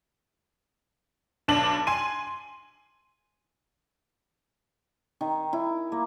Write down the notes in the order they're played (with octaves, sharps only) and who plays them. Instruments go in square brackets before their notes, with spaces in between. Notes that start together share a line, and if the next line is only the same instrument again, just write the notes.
[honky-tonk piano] B1 D4 F#7
G#5 C6 D#7
[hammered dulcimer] D#3
E4
A#3